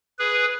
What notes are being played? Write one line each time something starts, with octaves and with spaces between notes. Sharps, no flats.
G#4 B4